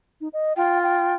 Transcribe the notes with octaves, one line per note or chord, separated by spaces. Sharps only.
D#4
D#5
F4 G5
G5